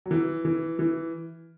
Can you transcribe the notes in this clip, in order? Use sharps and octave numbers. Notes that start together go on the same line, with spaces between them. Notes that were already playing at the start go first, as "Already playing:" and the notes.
F#3
E3
E3
E3